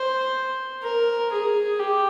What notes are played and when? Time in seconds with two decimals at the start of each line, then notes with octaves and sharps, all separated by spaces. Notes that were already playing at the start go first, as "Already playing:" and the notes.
Already playing: C5
0.83 A#4
1.32 G#4
1.79 G4